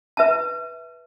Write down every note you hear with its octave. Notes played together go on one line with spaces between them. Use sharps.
B4 E5 A5